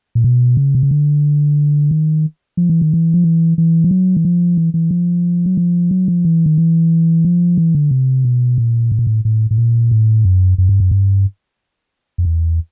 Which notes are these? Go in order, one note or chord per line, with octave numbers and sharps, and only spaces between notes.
A#2
B2
C#3
C3
C#3
D3
D#3
F3
E3
D#3
E3
F3
E3
E3
F3
F#3
E3
F3
E3
E3
F3
F#3
F3
F#3
F3
E3
D#3
E3
F3
E3
D3
C3
B2
A#2
A2
A#2
A2
A2
A2
A#2
A2
F#2
F#2
G2
F#2
G2
F2
E2